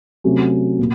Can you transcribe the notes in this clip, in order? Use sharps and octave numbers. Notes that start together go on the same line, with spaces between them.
C3 F#3 A3 C#4
A#2